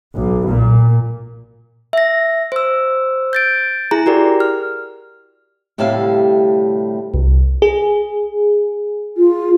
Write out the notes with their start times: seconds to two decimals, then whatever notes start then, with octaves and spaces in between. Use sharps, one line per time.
0.15 B1
0.48 A#2
1.93 E5 A#6
2.52 C5 E6
3.33 G6 A6 D7
3.91 E4 G#4 A#5
4.06 F#4 G4 A#4 D5
4.40 F6
5.78 D2 A2 C3 G3 E5 F5
7.14 C2
7.62 G#4
9.17 F4